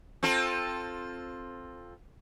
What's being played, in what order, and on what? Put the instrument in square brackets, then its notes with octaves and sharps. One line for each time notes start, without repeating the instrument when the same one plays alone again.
[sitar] C4 F4 A4